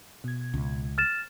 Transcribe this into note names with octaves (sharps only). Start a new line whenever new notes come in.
B2 G#6
C#2
F6 A6 E7